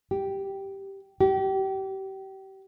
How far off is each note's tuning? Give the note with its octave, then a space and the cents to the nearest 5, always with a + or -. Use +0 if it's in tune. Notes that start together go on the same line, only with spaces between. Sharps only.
G4 -5
G4 -30